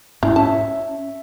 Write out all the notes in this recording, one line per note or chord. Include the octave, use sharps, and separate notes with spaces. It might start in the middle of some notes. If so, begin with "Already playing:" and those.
G#2 C#4 E4
C#4 E5 A5